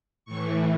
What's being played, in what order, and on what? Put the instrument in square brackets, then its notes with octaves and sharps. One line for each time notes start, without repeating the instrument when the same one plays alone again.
[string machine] A2 E3 C#6